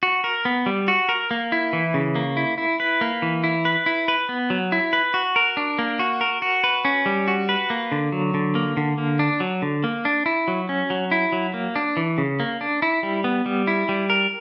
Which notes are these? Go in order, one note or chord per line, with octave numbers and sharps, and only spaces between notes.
F#4
A#4
B3
G3
F#4
A#4
A#3
E4
E3
C#3
A#3
E4
E4
B4
A#3
E3
E4
B4
E4
B4
B3
F#3
E4
B4
F#4
A#4
D4
A#3
F#4
A#4
F#4
B4
C#4
G3
F#4
B4
A#3
D3
F#3
D3
A#3
D3
A#3
D4
F#3
D3
A#3
D4
E4
F#3
C#4
F#3
E4
F#3
A#3
D4
E3
C#3
A#3
D4
E4
G3
B3
G3
E4
G3
A#4